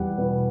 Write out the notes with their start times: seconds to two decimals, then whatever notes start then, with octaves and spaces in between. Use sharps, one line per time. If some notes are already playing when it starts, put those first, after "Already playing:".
Already playing: E2 G3 F#5
0.18 B2 B4